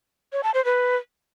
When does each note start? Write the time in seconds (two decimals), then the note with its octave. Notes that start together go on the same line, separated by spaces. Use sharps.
0.33 C#5
0.43 A5
0.54 C5
0.65 B4